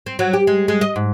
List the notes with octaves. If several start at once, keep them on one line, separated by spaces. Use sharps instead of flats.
C4
F#3
G4
G#3
G#3
D#5
G#2